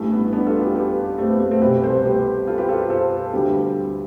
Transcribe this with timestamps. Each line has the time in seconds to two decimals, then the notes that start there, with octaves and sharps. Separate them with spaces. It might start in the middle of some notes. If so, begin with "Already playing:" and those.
Already playing: A1 G2 E3 A3
0.12 B3
0.32 B3 D4
0.47 F4 A4
0.62 G4 B4
0.75 G4 B4
1.18 A3 C4
1.30 B3
1.40 A3
1.51 A3 C4
1.62 C2 B2 G3 G4 B4
1.83 A4 C5
2.05 G4 B4
2.47 F4 A4
2.58 G4 B4
2.69 F4 A4
2.90 A4 C5
3.33 D2 D3 G3 G4 B4